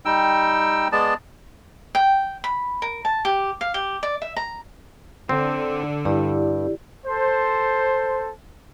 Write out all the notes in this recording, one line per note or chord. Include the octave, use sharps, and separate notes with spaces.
G3 D#4 G5 E6
G#3 B3 D5 A5
G5
B5
A#4
A5
G4
F5
G4
D5
E5
A#5
D3 C4
G2 E4 G4 D5
A4 C5